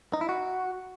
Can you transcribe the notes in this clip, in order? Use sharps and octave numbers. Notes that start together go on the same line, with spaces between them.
D#4
E4
F#4